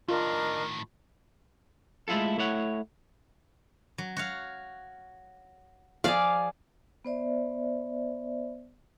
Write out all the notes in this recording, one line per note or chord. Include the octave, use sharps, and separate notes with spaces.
A2 D#3 D4 F4 A#4 D#5
G#3 A3 E4 F4 A4
A3 E4 C#5 F#5
F#3
F#4 C#5 F5
F3 G#4 D5 F5
B3 C5 D5 E5